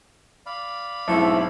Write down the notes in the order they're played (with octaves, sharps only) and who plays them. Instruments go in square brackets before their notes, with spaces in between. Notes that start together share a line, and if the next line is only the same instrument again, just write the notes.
[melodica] D5 F5 B5
[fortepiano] B1 G#2 [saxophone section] A3 C4 E4